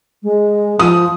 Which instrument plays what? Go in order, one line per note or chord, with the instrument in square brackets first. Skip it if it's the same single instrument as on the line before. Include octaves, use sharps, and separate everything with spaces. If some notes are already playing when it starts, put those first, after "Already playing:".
[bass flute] G#3
[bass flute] F3 [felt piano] D#6